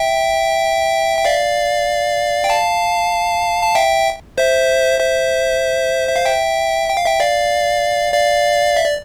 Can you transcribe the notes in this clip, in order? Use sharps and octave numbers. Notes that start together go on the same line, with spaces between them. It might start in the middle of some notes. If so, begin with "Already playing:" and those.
Already playing: E5 G5
G5
D5 F5
G5
F5 A5
A5
E5 G5
C5 E5
C5 E5
E5
F5
E5 G5
G5
F5
E5 G5
D5 F5
D5 F5
E5
D5